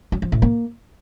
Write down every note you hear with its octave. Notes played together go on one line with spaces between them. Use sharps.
F#3
F3
A2
A#3